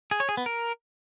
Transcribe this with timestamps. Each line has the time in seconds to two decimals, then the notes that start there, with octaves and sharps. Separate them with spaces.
0.11 G#4
0.20 C#5
0.29 G#4
0.37 B3
0.46 A#4